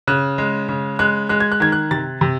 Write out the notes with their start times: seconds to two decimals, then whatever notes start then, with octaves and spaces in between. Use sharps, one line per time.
0.07 C#3 F#6
0.38 G#3
0.69 C#3
0.99 G#3 F#6
1.29 G#3 F#6
1.40 G#6
1.52 F#6
1.60 D#3 G#6
1.72 F#6
1.91 C3 A6
2.21 C3